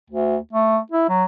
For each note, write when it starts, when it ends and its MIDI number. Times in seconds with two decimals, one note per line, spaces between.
0.10 0.37 38
0.53 0.78 57
0.92 1.06 64
1.09 1.24 54